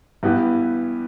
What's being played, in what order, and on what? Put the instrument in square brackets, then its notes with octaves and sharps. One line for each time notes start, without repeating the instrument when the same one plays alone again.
[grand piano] G2 E3 B3 E4 G4